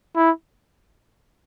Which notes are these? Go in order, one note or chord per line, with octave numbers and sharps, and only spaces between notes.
E4